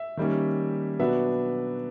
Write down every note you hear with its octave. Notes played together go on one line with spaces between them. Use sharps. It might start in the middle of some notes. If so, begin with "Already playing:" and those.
Already playing: E5
D#3 G3 A#3 C#4
B2 F#3 B3 D4 E5